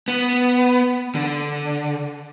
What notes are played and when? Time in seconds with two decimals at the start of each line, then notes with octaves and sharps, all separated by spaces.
0.08 B3
1.15 D3